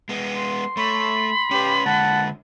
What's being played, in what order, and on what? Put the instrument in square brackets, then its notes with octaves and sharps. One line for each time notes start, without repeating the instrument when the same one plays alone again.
[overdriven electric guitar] G#3 B3
[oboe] C6
[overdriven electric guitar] A3 [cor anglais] C#5 [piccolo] B5
[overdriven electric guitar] C#4 B4 [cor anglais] G4
[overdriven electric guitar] D3 G#3 [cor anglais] F#5 [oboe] A5